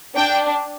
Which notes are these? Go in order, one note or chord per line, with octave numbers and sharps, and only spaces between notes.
D4 G5